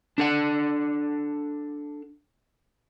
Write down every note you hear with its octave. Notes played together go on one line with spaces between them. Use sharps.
D4 A4 F#5